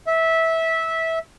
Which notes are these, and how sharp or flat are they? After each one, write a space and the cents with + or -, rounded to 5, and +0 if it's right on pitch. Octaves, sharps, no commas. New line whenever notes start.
E5 -15